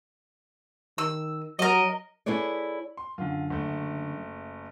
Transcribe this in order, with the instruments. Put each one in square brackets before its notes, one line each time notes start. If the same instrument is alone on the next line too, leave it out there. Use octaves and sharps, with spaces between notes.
[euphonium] D#3 [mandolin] E6
[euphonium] F#3 [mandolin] A#4 D#5
[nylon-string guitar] E4 G#4 A4 B4 C#5 D5
[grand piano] C6
[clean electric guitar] F#2 D3 [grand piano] F4
[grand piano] F#1 A3